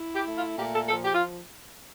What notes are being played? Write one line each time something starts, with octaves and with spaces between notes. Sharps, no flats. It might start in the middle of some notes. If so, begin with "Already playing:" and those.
Already playing: E4
G4
A3
F4
A#2 G4
A4
F3 A4
G4
F4